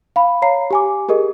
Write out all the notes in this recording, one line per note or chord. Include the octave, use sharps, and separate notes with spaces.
F5 B5
C#5 F5 A#5 C7
G4 G#5 D6
G4 G#4 A#4 D#5